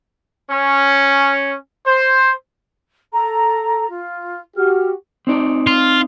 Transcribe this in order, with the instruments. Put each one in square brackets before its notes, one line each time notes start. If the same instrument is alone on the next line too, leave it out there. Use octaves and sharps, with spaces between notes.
[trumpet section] C#4
C5
[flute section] A4 A#5
F4
[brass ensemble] F#4 G4 [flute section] F6
[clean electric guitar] C4 D#4 D5
[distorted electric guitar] F4